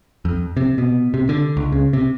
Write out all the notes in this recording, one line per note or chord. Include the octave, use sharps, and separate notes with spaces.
F2
C3
B2
C3
D3
C#2
C#3
C3